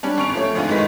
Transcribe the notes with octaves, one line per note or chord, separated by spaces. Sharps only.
G3 C#4 D4
G#1 C#6 D7 F7
F3 A3 C#5
G#1 D2 G#2 F4 D#7
G1 D#3 E3 G#3 B4 B6